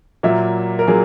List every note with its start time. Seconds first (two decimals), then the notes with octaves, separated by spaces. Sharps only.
0.23 A#2 F#3 A#3 E5
0.79 A#4
0.87 A#2 F#3 A#3 G#4